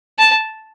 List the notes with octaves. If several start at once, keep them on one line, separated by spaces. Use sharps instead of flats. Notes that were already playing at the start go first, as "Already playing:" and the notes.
A5